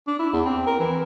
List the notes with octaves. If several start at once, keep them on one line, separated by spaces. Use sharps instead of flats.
D4
E4
E2
C4
A#4
E3